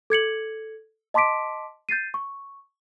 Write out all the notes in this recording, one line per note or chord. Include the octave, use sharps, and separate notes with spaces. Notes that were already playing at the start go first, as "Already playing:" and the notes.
A4 G#6 C#7 F#7
D#5 A5 C6 D6 B6 D7
G6 A6 C7 D#7
C#6